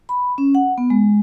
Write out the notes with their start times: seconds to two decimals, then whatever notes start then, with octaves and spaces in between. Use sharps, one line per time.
0.09 B5
0.38 C#4
0.55 F#5
0.78 B3
0.90 G#3